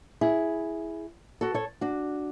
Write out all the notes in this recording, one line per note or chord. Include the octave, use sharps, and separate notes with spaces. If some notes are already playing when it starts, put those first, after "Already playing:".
E4 G#4
F#4 A4
A4 C#5
D4 F#4